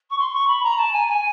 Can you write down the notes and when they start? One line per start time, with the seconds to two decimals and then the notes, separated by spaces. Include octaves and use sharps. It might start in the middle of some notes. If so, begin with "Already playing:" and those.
0.10 C#6
0.18 C6
0.29 C6
0.33 C#6
0.47 B5
0.63 A#5
0.77 A5
0.92 G#5
1.08 G#5